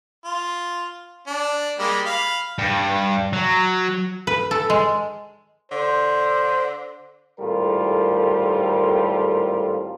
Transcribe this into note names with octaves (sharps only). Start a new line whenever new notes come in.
F4
D4
G3 G#3 A#3
F5 B5
G2
F#3
B4
A4
G#3
D3 C5
G#1 A2 G3 F4 A4 A#4